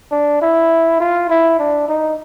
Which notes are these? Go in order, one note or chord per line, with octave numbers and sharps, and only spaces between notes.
D4
E4
F4
E4
D4
D#4